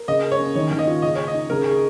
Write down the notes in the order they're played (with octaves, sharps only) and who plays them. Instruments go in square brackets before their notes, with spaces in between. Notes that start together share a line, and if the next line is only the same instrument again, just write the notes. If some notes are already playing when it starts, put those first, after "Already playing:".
Already playing: [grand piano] A#4
[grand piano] C#3 [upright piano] D#5
[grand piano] A#4
[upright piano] C#5
[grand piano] C#4
[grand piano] D#3 [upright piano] C#5
[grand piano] D#3
[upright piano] D#5
[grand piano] F4
[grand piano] C#3 [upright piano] D#5
[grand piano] G#4 [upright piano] C#5
[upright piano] D#5
[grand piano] D#4
[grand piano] C#3 [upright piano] A#4
[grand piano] G#4